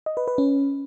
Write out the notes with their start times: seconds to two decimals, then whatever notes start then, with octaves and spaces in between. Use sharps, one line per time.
0.06 D#5
0.17 B4
0.28 B4
0.38 C#4